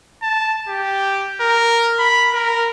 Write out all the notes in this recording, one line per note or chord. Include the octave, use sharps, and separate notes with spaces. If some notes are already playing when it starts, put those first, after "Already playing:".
A5
G4
A#4
B5
A#4